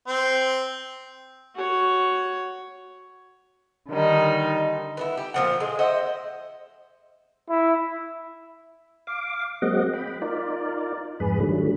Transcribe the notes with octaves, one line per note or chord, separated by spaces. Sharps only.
C4
F#4 C#5
D3 D#3 G3 D#4
B3 D#4 E4
G4
A#2 F3 F#5
G#3
C5 D#5 E5 F#5
E4
F5 D6
F#3 G#3 A#3 C4 D#5 F#5
G5 B5
D#4 F4 A#4 D5
F2 G#2 G#4 B4 B5
D3 D#3 F#3 G3 A3